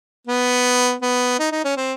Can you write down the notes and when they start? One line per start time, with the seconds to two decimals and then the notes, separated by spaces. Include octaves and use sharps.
0.27 B3
1.02 B3
1.40 D#4
1.52 D#4
1.65 C#4
1.77 C4